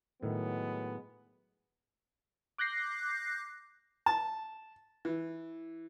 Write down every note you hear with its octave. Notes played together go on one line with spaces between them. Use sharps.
A2 D#3 F#3 G#3 B3
D6 F#6 G6 A#6 C7
A5
E3